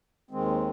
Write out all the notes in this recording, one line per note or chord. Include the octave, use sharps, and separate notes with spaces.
D#2 D#3 G#3 C4